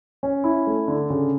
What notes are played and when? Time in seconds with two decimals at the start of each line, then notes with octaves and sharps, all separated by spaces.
0.23 C#4
0.44 E4
0.67 A3
0.88 D3
1.10 C#3